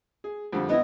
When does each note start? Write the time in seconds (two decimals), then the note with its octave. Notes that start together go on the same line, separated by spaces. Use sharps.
0.24 G#4
0.53 F2 D3 G3
0.70 B3 E4 D#5